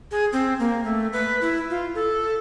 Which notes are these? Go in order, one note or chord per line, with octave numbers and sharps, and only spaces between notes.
G#4
C4
A#3
A3
B4
E4
F4
A4